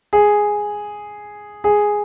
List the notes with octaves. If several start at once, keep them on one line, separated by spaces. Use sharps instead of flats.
G#4
G#4